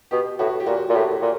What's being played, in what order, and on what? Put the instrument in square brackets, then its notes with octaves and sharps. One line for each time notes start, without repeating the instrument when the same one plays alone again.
[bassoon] B2 [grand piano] G4
[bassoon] A2 [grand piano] F#4
[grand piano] G4
[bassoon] A#2 [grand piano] F#4
[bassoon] A#2
[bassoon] A2 [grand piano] G4
[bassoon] A#2